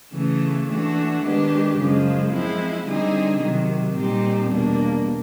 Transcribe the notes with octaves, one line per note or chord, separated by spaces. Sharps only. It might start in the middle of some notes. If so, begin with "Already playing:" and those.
C#3 E3 A3
E3 A3 D4 F#4
D#3 G#3 B3 D4 G4
F#2 C#3 F3 G#3
F3 G#3 C4 E4
D3 G3 C4 D#4 G#4
C3 D#3 F#3
A#2 G3 C4 D#4 G4
E2 B2 G3 A#3 D4